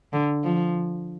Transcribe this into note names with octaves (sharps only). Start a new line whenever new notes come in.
D3
F3